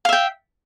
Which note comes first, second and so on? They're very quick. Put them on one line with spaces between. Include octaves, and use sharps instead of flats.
F5 E5 G5